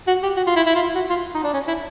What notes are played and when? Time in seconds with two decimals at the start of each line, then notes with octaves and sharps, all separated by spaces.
0.07 F#4
0.23 G4
0.37 F#4
0.47 F4
0.56 E4
0.66 E4
0.75 F4
0.95 F#4
1.10 F4
1.35 D#4
1.44 D4
1.54 C#4
1.68 E4